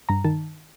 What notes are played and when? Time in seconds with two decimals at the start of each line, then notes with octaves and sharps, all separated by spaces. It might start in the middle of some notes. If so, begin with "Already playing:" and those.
0.09 G2 A#5
0.25 D#3 A5